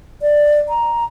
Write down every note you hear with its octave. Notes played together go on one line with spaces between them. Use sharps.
D5
A#5